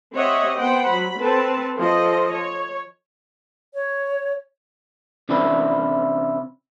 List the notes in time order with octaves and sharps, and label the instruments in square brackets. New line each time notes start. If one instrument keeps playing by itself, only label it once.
[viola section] C4 G4 C#5 D#5 E5 F#5
B3 C5 F#5 G5
F#3 B5
C4 A4 B4 A5
F3 A4 C5 D#5
C#5
[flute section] C#5
[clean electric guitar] C3 E3 C#4 D4 E4 B4